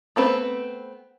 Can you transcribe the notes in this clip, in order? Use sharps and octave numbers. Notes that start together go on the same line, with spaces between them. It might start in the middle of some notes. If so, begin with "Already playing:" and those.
A3 B3 C4 B4